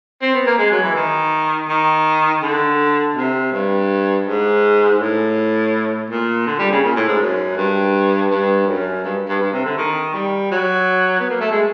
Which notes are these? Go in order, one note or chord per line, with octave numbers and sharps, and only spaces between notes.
C4
B3
A#3
G#3
F#3
E3
D#3
D#3
D3
C3
G2
G#2
A2
A#2
D3
G3
C#3
A#2
A2
G#2
F#2
G2
G2
F#2
G2
G2
G2
C3
D3
D#3
G3
F#3
B3
A#3
A3
G#3